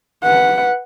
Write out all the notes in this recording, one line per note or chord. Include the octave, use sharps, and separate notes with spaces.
B4 F#5